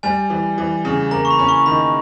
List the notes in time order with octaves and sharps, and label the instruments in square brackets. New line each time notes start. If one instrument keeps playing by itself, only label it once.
[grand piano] G3 [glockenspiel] G#5
[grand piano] E3
E3
C#3
[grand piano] A#3 [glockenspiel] A#5
[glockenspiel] C#6
B5
[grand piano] C#4
[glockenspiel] C#6
[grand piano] D#3 [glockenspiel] B5